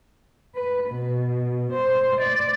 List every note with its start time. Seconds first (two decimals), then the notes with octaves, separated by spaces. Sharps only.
0.57 B4
0.91 B2
1.73 C5
2.22 D5